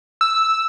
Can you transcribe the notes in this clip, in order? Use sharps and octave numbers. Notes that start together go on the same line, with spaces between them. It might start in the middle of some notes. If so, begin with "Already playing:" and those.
E6